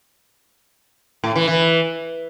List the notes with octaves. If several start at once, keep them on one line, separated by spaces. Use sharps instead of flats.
A2
E3
E3